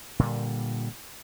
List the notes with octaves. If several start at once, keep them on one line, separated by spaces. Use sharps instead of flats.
A#2 D3 G3